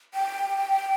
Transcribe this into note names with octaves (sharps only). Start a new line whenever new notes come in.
G5